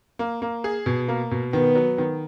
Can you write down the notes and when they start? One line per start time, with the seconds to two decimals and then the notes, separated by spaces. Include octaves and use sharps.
0.19 A#3
0.42 A#3
0.64 G#4
0.86 B2
1.08 A#3
1.31 B2
1.53 D#3 B3
1.75 F#3
1.98 D#3